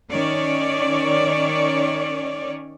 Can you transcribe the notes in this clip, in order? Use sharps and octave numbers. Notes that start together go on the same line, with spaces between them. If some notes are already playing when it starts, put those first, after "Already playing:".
D#3 C#4 C#5 D5